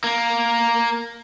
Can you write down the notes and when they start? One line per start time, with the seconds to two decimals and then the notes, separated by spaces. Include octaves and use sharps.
0.04 A#3